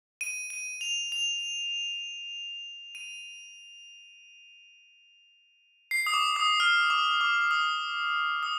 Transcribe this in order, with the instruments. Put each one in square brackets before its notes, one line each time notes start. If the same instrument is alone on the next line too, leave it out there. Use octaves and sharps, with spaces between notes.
[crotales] D#7
D#7
F7
F7
D#7
C7
D#6
D6
D#6
F6
D6
D6
D#6
D#6